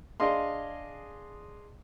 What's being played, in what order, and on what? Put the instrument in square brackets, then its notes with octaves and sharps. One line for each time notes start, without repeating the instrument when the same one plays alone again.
[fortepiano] D4 G#4 D#5 F5 C6